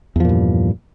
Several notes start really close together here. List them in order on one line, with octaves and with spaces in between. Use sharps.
E2 F3 A#2 G2